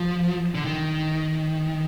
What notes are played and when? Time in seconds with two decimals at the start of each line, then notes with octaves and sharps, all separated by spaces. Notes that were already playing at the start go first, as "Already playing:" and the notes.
Already playing: F3
0.55 D3
0.64 D#3